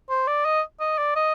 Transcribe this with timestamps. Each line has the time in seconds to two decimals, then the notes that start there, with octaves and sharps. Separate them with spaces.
0.10 C5
0.27 D5
0.45 D#5
0.80 D#5
0.98 D5
1.16 D#5